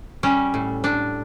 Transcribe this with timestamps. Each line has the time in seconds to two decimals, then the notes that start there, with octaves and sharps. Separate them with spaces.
0.23 G3 C#4
0.54 A2
0.84 A2 D4